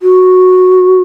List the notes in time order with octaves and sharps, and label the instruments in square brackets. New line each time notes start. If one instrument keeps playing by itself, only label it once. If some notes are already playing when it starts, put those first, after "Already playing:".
[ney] F#4